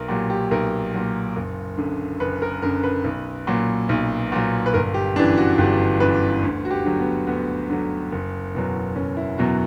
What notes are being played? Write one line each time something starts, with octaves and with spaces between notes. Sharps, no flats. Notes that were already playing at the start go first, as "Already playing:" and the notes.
Already playing: B1 A#4
A#2 F#3 G4
G4
B1 A#4
A#2 F#3
F#1
F#2 D3
F#1 B4
A#4
F#2 D3 A#4
B4
B1
A#2 F#3
B1
A#2 F#3
B4
G1 A#4
G4
F#2 E3 D4
F#4
G1 G4
F#2 E3 B4
D2
F#4
G4
D3 F#3
B3
D2 B3
D3 F#3
F#1
E2 B2 F#3
F#1 C#4
E4
E2 B2 F#3 F#4